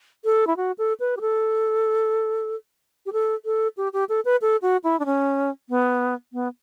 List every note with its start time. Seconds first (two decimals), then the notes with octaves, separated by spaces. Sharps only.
0.25 A4
0.47 E4
0.57 F#4
0.78 A4
1.00 B4
1.17 G4
1.21 A4
3.06 G4
3.13 A4
3.45 A4
3.77 G4
3.93 G4
4.09 A4
4.25 B4
4.42 A4
4.62 F#4
4.84 E4
4.99 D4
5.06 C#4
5.69 B3
6.33 B3